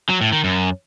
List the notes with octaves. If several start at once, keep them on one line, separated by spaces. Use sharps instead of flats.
F#3
A2
D#3
F#2